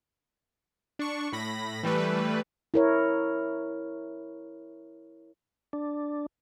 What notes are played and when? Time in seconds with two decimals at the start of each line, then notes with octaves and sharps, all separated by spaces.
0.99 D4 C#6
1.32 A2 B5 A#6
1.83 E3 G3 A3 B4
2.74 E4 A#4 C#5
5.73 D4